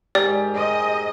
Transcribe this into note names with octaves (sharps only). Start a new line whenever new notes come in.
G#2 G4 A#4 D5 G#5
G#4 A#4 C5 D#5